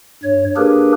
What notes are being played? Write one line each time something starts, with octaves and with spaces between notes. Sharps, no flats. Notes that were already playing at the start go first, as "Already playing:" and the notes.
G2 C#5
A#3 D4 G4 G#4 A#4 B4